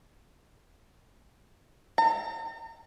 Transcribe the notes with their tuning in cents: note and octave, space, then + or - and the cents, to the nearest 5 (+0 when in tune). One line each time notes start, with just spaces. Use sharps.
A#5 -45